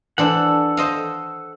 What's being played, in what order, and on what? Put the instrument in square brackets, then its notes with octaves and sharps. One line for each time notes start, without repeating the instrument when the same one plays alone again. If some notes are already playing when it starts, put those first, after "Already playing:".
[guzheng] E3 D4 C5 [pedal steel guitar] A4 F#5
[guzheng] C5 D#5 F5